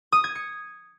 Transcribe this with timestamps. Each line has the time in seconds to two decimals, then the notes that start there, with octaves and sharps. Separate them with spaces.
0.12 D#6
0.24 G#6
0.35 C#7